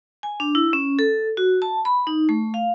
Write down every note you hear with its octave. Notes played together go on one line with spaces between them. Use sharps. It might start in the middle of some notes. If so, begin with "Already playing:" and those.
G#5
D4
E4
C#4
A4
F#4
A5
B5
D#4
A3
F5